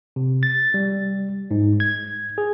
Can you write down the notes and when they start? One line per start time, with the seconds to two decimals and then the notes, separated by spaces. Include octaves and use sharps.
0.16 C3
0.43 A6
0.74 G3
1.51 G#2
1.80 G#6
2.38 G#4